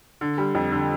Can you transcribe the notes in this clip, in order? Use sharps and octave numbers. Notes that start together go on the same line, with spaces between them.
D3
G3
F2
D3